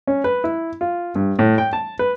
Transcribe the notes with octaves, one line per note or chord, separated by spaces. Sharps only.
C#4
B4
E4
F4
G2
A2
G5
A5
B4